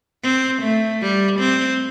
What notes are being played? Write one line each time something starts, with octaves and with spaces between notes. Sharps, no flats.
C4
A3
G3
C4